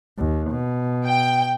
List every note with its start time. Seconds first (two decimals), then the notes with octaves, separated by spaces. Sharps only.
0.18 D#2
0.51 B2
1.06 G5